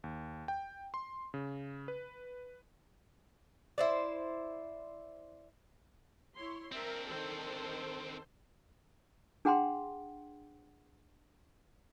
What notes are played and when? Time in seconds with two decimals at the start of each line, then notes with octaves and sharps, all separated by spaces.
0.04 D#2
0.48 G5
0.94 C6
1.34 C#3
1.88 B4
3.78 E4 C5 D5
6.36 E4 C#5 C6
6.72 C4 D4 A#4 E5
7.08 D#3 A4 C5
9.45 D4 G#4 F#5 G5 A#5 C6